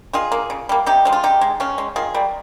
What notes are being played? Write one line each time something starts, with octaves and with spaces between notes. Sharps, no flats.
D#3 F4 G#4
A#3
C#3
G3 A#3
C3 D#4 G4
F3 G#3
F4
C#3 D#4 G4
G#3
C#3 C#4
G#3
D#3 F4 G#4
G3 A#3